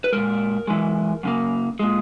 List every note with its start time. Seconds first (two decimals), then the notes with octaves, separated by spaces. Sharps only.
0.04 B4
0.13 A#2 G#3 A#4
0.67 F#2 E3 G#3
1.23 F#2 C#3 A#3
1.80 A#2 G#3